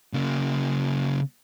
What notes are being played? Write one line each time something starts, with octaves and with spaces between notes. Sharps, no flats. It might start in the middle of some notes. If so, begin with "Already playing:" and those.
C#3 A#3